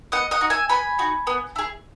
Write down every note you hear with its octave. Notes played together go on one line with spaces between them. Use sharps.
B3 D#5 F#5
D#5 F#5
D#4 F#4
E5 G#5
B3 G#5 B5
D#4 F#4
B3
E4 G#4